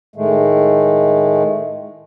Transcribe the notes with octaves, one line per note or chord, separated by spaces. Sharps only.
A2 D#3 G#3 A3